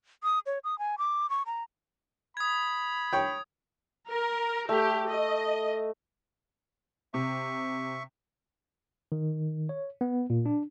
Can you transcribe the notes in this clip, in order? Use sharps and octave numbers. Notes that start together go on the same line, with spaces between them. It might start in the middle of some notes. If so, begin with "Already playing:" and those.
D#6
C#5
D#6
G#5
D6
C#6
A#5
B5 D#6 G#6
C#5 G5
A#4
A3 G4
D#5
C3 E5 C#6
D#3
C#5
B3
A#2
D4